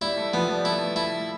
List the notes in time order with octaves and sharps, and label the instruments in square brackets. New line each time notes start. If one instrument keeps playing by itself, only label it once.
[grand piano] G3 [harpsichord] E4
[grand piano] A3
[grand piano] F3 [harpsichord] B3
[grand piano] G3
[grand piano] A3 [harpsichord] E4
[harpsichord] E4